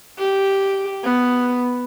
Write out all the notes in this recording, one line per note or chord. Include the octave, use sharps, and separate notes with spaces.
G4
B3